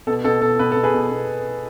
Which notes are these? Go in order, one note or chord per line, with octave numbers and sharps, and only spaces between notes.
B2 A4
B2 A4
B2 A4
B2 B4
B2 A4
G#4 B4
B2
B2